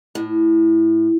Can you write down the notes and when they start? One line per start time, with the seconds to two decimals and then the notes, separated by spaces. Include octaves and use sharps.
0.15 A2